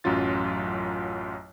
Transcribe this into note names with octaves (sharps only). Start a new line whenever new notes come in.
A1 F#2 F#3 C#4 F4 A6